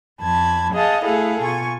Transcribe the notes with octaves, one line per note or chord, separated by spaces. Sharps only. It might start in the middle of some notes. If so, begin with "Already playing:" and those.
F2 A5 B5 G#6
G#4 D#5 F5 F#5 A5
A3 E4 G#4 A4 F5 F#5
B2 F4 G#5 C#6